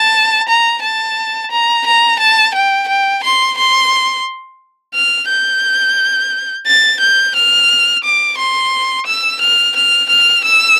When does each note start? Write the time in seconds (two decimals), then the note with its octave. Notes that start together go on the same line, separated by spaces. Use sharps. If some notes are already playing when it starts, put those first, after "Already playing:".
Already playing: A5
0.48 A#5
0.83 A5
1.51 A#5
1.86 A#5
2.19 A5
2.55 G5
2.88 G5
3.23 C6
3.57 C6
4.94 F6
5.28 G6
6.67 A6
7.00 G6
7.36 F6
8.04 D6
8.38 C6
9.06 E6
9.41 F6
9.76 F6
10.10 F6
10.44 E6